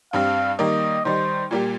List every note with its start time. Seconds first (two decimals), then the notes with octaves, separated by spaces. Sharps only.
0.13 G2 G3 C4 F5
0.59 D#3 G3 A#3 D#5
1.05 D#3 G3 D#4 C5
1.51 A#2 G3 A#3 G4